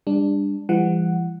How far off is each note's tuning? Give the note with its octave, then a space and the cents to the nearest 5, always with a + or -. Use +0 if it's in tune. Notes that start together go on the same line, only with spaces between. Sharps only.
G3 +35 D4 +0
E3 +45 G3 +35 F#5 +0